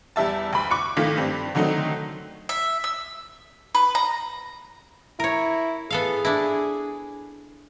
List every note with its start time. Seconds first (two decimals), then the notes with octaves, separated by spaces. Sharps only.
0.16 E2 G3 E5 A5
0.53 D2 B5
0.71 C#6 D6 F#6 C#7
0.97 G#1 D#3 A3 F4 A#6 B6
1.17 G2 C4
1.55 D3 D#3 F#3 A3 C4 D#4
2.49 E5
2.84 E6
3.75 B4
3.95 A#5
5.20 E4 A#4 C#5
5.90 B3 G#4 A4 F5
6.25 D4 E4